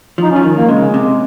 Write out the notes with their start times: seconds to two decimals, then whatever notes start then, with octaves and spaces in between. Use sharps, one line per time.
0.18 F3 D#4
0.31 C#4
0.36 F3
0.43 D#3
0.57 A#3
0.69 C#3 G#3
0.94 C3